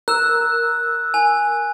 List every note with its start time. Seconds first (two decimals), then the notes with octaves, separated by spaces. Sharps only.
0.08 A#4 E6 F#6
1.14 G#5